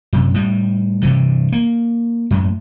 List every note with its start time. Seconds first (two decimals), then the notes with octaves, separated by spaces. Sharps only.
0.13 F#2 C3
0.34 A2 G3
1.03 G2 C3 E3
1.52 A#3
2.31 F#2 A2